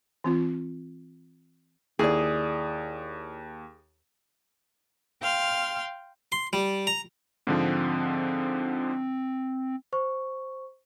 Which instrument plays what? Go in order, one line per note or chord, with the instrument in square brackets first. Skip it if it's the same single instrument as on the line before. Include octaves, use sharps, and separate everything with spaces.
[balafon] E3 C4 F4
[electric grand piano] D#2 [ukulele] E4 D5 [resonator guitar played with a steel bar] G#4
[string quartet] F5 G5 C6 F6
[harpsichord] C6
G3
A#5
[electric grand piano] G#2 D3 F3 [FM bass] C4
[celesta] C5 C#6